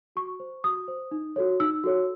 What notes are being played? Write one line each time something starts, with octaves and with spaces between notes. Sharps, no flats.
F#4 C#6
C5
F#4 D#6
C5
D#4
F#4 A4 C#5
D#4 E6
F#4 A4 C#5